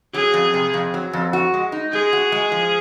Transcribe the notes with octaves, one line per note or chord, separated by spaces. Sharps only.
F#3 G#4
F2
C3
F2
F#3
F2
F#4
G#3
D#4
G#3 G#4
F#4
G#3
F3